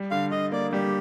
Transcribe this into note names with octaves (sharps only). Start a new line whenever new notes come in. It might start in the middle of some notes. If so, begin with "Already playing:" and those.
Already playing: G3
D3 F5
D3 D#5
A#3 D5
G3 G4